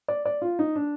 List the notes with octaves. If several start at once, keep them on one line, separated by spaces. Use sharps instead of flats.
D5
D5
F4
D#4
D4